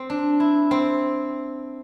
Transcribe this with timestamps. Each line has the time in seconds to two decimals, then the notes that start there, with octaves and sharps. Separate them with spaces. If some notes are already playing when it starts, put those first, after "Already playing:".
Already playing: C4
0.10 D4
0.40 E4
0.71 C4